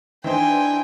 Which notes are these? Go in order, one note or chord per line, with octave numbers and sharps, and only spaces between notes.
E3 D4 D#4 C5 G5 G#5